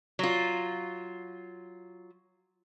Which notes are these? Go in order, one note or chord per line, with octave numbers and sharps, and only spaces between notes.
F#3 F4